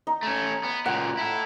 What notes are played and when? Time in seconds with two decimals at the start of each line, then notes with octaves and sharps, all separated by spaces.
0.07 D#4
0.23 A3 C#4
0.64 B3
0.86 C#2 A#2 F#5
1.17 E4 A4